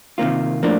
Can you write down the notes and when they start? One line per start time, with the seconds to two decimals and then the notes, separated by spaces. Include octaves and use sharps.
0.18 C3 D#3 A#3 F4
0.63 A2 F3 A#3 D4